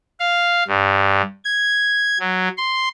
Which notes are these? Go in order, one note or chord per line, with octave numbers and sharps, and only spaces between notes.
F5
G2
G#6
F#3
C6